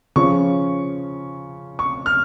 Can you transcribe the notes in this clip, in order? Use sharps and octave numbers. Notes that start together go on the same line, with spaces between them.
C#3 F3 C#4 C#6
C#6
F6